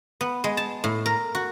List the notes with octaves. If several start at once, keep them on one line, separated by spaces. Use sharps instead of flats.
B3
G#3
A5
A2
A#4
F#4